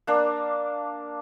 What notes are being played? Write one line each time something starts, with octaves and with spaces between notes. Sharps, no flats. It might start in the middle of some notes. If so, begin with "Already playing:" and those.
A#3 D4